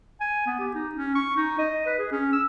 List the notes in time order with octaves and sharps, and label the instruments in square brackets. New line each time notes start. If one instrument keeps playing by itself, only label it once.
[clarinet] G#5
B3
G4
D#4
C#4
C#6
D#4
D#5
B4
G#4
C#4
E6